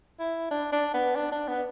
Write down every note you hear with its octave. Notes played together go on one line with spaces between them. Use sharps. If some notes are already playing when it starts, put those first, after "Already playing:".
E4
D4
D4
B3
D4
D4
B3